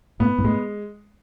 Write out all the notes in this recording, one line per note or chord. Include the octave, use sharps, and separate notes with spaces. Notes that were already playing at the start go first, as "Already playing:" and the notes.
A2 B3
G#2
A2 G#3